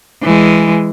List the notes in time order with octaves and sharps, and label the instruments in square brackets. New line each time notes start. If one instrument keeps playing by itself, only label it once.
[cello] E3 G#3